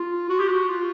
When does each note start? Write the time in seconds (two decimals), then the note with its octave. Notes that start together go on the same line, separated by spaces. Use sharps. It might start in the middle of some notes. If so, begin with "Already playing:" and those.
Already playing: F4
0.30 F#4
0.40 G4
0.49 F#4
0.68 F4